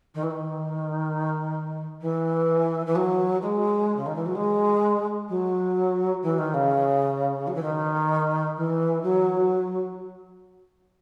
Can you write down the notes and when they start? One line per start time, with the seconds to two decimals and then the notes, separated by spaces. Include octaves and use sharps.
0.14 D#3
0.23 E3
0.30 D#3
2.01 E3
2.86 E3
2.95 F#3
3.42 G#3
3.96 C#3
4.06 D#3
4.15 E3
4.26 F#3
4.35 G#3
5.29 F#3
6.22 E3
6.38 D#3
6.54 C#3
7.47 F#3
7.55 E3
7.62 D#3
8.57 E3
9.03 F#3